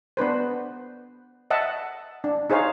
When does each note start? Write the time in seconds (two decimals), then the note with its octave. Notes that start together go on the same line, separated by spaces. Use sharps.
0.17 B3 D4 B4 C5
1.51 D#5 E5 F#5 A5
2.24 D4
2.50 D#4 G#4 C5 C#5 F5